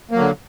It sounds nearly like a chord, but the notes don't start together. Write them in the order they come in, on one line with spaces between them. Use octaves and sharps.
A#3 F#3 D3